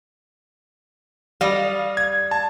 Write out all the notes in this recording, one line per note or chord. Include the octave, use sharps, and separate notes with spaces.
G3 D#5 F5
G#6
A5